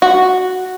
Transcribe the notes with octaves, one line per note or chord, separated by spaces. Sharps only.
F#4